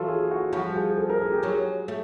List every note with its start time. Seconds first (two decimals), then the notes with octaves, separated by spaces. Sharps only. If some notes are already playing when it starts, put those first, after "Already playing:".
Already playing: E3 F#3 F4 A4
0.08 G#4
0.31 F#4
0.53 F3 G3 F#4
0.76 G#4
0.98 A4
1.10 A#4
1.21 G#4
1.32 G4
1.43 F#3 G#3 G#4
1.88 A3